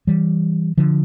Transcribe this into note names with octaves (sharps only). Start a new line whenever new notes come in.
E3 G3
D3 F3